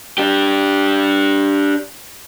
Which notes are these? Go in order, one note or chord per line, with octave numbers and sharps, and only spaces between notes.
D4 G4